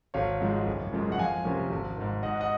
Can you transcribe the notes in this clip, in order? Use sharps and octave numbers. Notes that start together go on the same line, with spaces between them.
G#1 C#5 F5
G#2 F3 G#3
F#1
F#2 F3 G#3
F#5
F2 F5 G#5
C3 F3 A#3 C#4
G#1
G#2 D#3
G#2 D#5 F#5
D#5 F#5